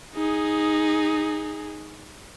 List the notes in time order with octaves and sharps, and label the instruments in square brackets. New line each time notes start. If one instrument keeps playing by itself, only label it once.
[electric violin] D#4 G#4